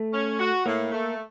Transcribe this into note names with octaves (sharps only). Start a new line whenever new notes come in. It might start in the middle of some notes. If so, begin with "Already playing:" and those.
Already playing: A3
C#4
F#4
A2 A#3
A3